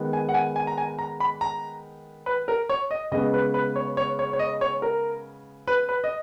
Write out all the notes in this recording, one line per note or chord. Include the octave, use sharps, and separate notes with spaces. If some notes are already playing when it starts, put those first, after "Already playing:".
Already playing: D#3 G#3 B3
G#5
F#5
G#5
G#5
A#5
G#5
A#5
B5
A#5
B4
A#4
C#5
D#5
C#3 G#3 B3 D#5
B4
B4
C#5
C#5
C#5
C#5
D#5
C#5
A#4
B4
B4
D#5